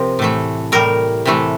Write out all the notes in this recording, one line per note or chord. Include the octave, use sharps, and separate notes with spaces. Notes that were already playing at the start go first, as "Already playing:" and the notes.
Already playing: C3 F3 A#4 C5
A2 E3 A3
A2 G3 A#4
C3 E3 A3